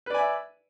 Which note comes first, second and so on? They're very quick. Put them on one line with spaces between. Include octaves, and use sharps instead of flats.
B4 D5 G#5 E5